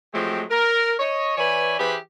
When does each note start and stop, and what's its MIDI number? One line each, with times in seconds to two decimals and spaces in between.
0.14 0.44 53
0.14 0.44 54
0.14 0.44 56
0.14 0.44 57
0.14 0.44 60
0.14 0.44 67
0.50 0.93 70
0.99 1.35 73
0.99 1.35 75
1.37 1.79 52
1.37 1.79 71
1.37 1.79 73
1.37 1.79 74
1.37 1.79 80
1.79 1.97 52
1.79 1.97 67
1.79 1.97 68
1.79 1.97 71
1.79 1.97 72
1.79 1.97 83